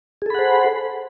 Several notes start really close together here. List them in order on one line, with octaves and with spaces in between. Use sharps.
G#4 A4 B5 F#5 C5